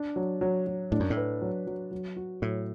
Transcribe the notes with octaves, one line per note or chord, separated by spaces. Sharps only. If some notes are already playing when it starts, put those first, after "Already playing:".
Already playing: D4
F#3
F#3
F#3
A2 D4
F#2
A2
B4
F#3
F#3
F#3
F#4
A2 F#3